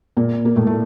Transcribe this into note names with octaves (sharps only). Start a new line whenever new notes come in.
A#2 A#3
A#3
A2 A3
A3